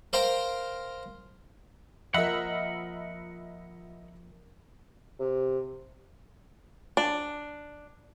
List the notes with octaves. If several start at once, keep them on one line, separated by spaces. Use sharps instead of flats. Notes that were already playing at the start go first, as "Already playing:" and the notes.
A#4 C5 F5 G5 A#5
F3 A#4 D#5 E5 F#5 B5
C3
D4